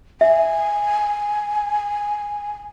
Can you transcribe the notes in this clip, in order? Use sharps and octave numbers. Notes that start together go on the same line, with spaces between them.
E5 G#5